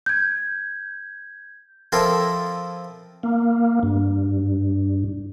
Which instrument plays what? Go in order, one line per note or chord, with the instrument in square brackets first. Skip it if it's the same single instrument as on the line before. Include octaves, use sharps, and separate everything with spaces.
[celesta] G6 G#6
[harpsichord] F3 C4 E4 F4 A4 A#4
[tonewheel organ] A#3
G2